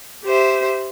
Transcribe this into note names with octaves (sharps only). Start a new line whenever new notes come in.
G4 C5 E5